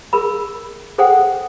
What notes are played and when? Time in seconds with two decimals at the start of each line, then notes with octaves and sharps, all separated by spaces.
0.13 G#4 A#4 B5
0.98 G#4 A4 C5 F#5 G5